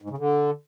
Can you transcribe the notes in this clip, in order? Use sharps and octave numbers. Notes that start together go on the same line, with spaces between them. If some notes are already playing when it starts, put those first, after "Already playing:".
G#2
C#3
D3